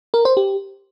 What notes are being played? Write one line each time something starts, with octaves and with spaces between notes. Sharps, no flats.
A#4
C5
G4